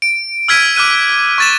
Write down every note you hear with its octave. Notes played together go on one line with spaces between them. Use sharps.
D7
E6 F6 G#6 B6 D7 D#7
D6 F6 F#6 D#7
C#6 A6 E7